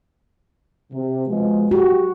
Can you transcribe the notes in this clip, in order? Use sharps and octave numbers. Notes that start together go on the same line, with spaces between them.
C3
B2 F3 G#3
F#4 G4